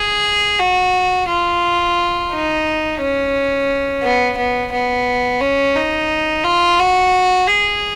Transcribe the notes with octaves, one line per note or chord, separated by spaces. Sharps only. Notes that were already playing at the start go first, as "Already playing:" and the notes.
Already playing: G#4
F#4
F4
D#4
C#4
B3
B3
B3
C#4
D#4
F4
F#4
G#4